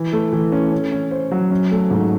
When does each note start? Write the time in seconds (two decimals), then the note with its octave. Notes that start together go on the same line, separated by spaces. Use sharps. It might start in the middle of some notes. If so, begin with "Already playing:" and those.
Already playing: E3
0.13 A3
0.33 E3
0.52 C#4
0.72 C#4
0.92 C#4
1.11 C5
1.31 F#3
1.51 C#4
1.71 A3
1.90 G#2